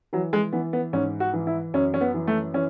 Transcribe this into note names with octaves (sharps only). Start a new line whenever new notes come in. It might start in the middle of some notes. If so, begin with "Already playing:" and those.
E3 F#3
G#3
E3 B3
B3
G#2 C#4
F#4
E3
E4
F#2 C#4
C#4
B3
E3
A3
E3 C#4